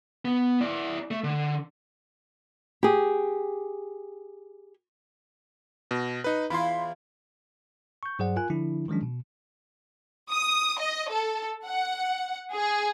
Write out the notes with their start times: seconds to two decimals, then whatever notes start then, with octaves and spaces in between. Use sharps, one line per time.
0.25 B3
0.61 E4 D5
1.11 A3
1.24 D3
2.83 G4 G#4
5.91 B2
6.24 D#4 B4
6.50 E2 E4 F4 B5 C6
8.03 C#6 G6
8.19 G2 F#3 G#4 C5 D5 F#5
8.36 F4 A#4 G#5 F#6
8.50 D3 F3 D4 E4
8.88 D#3 F3 F#3 G#3 C#4 D4
9.03 B2
10.30 D#6
10.80 D#5
11.11 A4
11.66 F#5
12.53 G#4